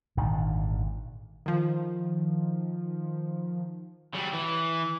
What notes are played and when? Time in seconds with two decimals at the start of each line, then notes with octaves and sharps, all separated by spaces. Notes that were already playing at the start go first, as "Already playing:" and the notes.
0.17 G#1 A#2 D3 D#3
1.46 D#3 F3
4.15 F#3 G3
4.34 E3